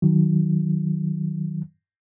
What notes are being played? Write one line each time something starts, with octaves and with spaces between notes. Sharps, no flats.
D#3 F#3